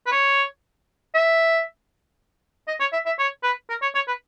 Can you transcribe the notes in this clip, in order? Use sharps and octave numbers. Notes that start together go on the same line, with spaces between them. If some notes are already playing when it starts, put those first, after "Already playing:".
B4
C#5
E5
D#5
C#5
E5
E5
C#5
B4
A#4
C#5
C#5
B4